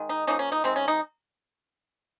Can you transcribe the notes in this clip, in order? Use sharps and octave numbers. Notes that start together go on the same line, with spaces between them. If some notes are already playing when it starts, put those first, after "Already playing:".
Already playing: D#3 G#3
D#4
F3 A#3 C#4 D#4
C#4
D#4
C3 D#3 G#3 C4
C#4
D#4